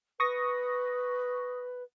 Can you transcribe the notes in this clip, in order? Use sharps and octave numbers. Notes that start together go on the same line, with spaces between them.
B4 C#6 D#6 A#6